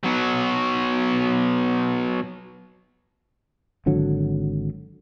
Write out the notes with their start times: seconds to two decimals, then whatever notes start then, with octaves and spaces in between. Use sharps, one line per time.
0.03 B2 F#3
3.86 G#1 D3 F#3